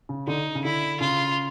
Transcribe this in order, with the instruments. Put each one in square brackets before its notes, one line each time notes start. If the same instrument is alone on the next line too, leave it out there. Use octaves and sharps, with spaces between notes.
[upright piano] C#3
[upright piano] D3 [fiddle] D#4
[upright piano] C#3
[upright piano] D3 [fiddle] E4
[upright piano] C#3 [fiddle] F4